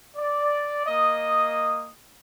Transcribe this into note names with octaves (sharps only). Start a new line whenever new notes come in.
D5
A#3 D#5 D#6